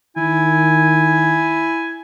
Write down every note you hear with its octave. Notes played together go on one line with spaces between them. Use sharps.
D#3 E4 G#5